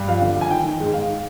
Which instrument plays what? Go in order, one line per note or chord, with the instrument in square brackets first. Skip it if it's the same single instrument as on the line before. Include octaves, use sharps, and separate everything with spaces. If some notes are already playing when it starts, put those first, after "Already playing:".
Already playing: [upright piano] G2
F2 F5
D3
F2
G#5
D#3 G5
D#3
G#2
G#2 F5